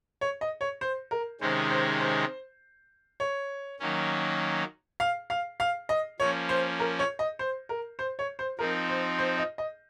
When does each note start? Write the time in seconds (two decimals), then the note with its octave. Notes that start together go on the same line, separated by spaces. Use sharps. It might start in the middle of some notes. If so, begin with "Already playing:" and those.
0.21 C#5
0.41 D#5
0.61 C#5
0.81 C5
1.11 A#4
1.41 C3 D#3 G#3 C#4 C5
1.71 C5
2.00 C5
3.20 C#5
3.79 D#3 F#3 A#3 C#4
5.00 F5
5.30 F5
5.60 F5
5.89 D#5
6.20 F3 A#3 C#4 C#5
6.49 C5
6.80 A#4
6.99 C#5
7.19 D#5
7.39 C5
7.69 A#4
7.99 C5
8.19 C#5
8.39 C5
8.59 F3 C4 D#4 A#4
8.89 C5
9.19 C5
9.38 D#5
9.58 D#5